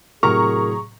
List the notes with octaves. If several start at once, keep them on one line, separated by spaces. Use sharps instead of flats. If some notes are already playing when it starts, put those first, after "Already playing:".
A2 C3 F#3 G#4 A#4 A#5 C#6